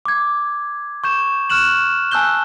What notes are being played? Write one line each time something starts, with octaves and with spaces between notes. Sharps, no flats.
D6 G#6
C#6 G6 E7
C#6 F6 F#6 E7 F#7
G#5 A5 E6 F#6 G6 G7